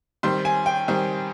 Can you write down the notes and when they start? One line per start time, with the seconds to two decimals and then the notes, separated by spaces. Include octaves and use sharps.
0.23 D#3 G3 C4 C6
0.45 G#5
0.66 G5
0.88 D#3 G3 C4